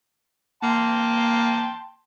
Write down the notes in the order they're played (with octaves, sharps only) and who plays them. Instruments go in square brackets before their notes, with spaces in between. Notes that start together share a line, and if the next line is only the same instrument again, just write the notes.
[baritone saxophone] A#3 [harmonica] G5 A5 C6